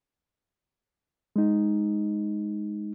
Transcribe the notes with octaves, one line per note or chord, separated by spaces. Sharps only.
G#3 D#4